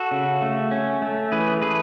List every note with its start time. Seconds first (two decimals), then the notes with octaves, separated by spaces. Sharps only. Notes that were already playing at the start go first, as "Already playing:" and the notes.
Already playing: F#4 A4
0.11 C#3
0.42 A3
0.71 C#4
1.02 A3
1.32 E3 G#4 B4
1.61 A3 G#4 B4